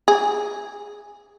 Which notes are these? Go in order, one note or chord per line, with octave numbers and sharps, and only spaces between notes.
G#4